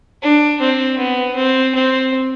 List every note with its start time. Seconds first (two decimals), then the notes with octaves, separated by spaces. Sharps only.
0.22 D4
0.61 C4
0.98 B3
1.36 C4
1.74 C4